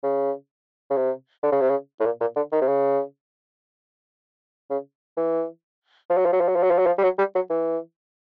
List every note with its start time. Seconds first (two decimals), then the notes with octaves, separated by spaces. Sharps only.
0.03 C#3
0.91 C#3
0.97 C3
1.43 D3
1.52 C#3
1.61 C3
1.70 C#3
2.00 A2
2.05 A#2
2.21 A#2
2.36 D3
2.52 D#3
2.61 C3
2.68 C#3
4.70 C#3
5.17 E3
6.10 F3
6.18 F#3
6.25 F3
6.33 F#3
6.40 F3
6.48 F#3
6.56 F3
6.63 F#3
6.71 F3
6.78 F#3
6.86 F3
6.98 G3
7.03 F#3
7.19 G3
7.35 F#3
7.50 E3